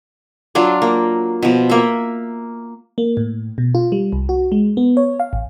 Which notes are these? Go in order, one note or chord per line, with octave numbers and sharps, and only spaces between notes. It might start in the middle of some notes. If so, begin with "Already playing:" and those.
F#3 D4 F4 D5
A#3
B2 F3
A#3 E5
A#3
A2
B2
F4
G3
C2
F#4
G#3
B3
C#5
F5
A1